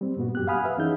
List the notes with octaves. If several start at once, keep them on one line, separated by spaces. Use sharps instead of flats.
G3 C4
G2 A#2 B3 F#4
F#2 G4 F#6
F5 F#5 G#5 B5 D#6 F6
B4 E5
E3 C#4 D#4 E4 G#4 G6